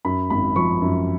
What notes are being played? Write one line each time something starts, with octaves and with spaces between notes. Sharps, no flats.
F#2 B5
G#1 B5
F3 C#6
F#2